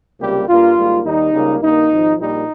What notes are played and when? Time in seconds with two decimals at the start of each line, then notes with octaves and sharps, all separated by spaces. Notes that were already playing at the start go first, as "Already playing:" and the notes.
0.19 C#2 C3 G3 A#3 G4
0.47 G2 G3 A#3 F4
0.76 G#1 G#2 G3 A#3
1.04 D#2 D#3 G3 D#4
1.32 C#2 C#3 G3 A#3
1.61 G2 D#3 A#3 D#4
1.89 G#1 G#2 F3
2.18 A#1 A#2 G3 A#3 D#4